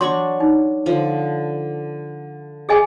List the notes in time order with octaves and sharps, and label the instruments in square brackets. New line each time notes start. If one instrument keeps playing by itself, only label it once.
[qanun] F#3 D4 C#6 [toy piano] C6
[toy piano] D#4
[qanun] D3 F3
[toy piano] G#4 D#5 G#5